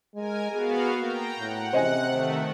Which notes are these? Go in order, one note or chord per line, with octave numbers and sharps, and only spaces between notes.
G#3 A#4 G#5
B3 F#4 G#4 F5
A#3 G5 A#5
A2 F#5
C3 C5 D#5 G#5
D#3 A3